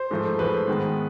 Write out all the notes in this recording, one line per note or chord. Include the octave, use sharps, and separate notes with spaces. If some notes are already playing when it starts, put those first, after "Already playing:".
Already playing: C5
G#2 F3 A3
G#2 F3 A3 B4
G#2 D#3 G#3 B3